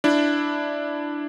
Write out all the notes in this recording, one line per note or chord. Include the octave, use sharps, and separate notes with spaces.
D4 E4